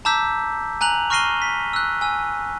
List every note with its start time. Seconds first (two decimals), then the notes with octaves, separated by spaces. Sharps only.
0.05 A5 A#5 D6 E6 G6 B6
0.81 G#5 A#5 F#6 F7 F#7
1.10 C#6 F6 A#6 C7 D#7 G7
1.42 B6
1.73 E6 F#6
2.01 G#5 E6